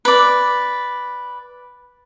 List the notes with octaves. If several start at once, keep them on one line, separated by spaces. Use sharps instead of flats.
B4 D5